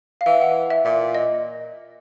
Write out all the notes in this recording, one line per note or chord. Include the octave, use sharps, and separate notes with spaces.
F5
E3 E5
F#5
E5
A#2 E5
D#5